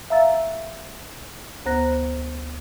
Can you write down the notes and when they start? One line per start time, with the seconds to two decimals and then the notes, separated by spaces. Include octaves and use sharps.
0.10 E5 F5 A#5 E6 A6
1.66 D2 B3 C5 A#5 F#6 A#6